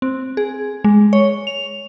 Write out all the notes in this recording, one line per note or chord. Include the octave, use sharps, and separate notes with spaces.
C4
G#4
G#3
C#5
F7